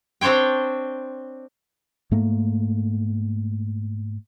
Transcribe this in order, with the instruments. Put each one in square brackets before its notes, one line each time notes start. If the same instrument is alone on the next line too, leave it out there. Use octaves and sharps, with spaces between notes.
[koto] C4 D4 C5 C#5 G5
[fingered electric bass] G#2 A3 A#3